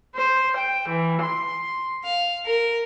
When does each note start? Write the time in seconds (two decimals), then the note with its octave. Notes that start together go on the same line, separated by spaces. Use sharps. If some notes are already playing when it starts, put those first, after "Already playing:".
0.15 C5
0.57 G5
0.88 E3
1.23 C6
2.04 F5
2.44 A#4